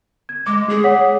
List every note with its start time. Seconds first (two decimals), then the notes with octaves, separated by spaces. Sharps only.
0.29 G#6
0.47 G#3 D6
0.70 G#4
0.84 C#5 F#5 B6